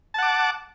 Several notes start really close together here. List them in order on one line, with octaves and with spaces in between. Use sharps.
A5 F#5 D6